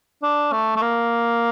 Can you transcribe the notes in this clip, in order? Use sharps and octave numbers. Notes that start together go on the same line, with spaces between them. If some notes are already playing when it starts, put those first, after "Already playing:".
D4
A3
A3
A#3